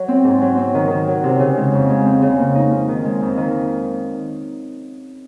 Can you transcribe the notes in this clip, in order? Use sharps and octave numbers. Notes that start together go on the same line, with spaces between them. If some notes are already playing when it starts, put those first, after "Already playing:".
Already playing: F#3
C4
G#2
F#3
C4
D#3
D#3
F#3
C3
C#3
G#3
F2
G#3
C4
C#3
A#3
D#4
F3
D#3
G#3
F2
D#3